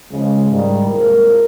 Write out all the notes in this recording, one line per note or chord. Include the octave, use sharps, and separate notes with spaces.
C#2 C#3 F3 G#3
G#2 D#3 G3
C2 A#2 F3 G#3 A#4